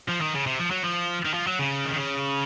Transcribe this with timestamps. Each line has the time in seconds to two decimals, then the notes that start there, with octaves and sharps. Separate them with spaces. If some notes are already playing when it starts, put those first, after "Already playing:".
0.08 F3
0.21 D#3
0.34 C#3
0.46 C3
0.59 F3
0.71 F#3
0.84 F3
1.25 D#3
1.34 F3
1.47 F#3
1.59 C#3
1.85 D#3
1.96 C#3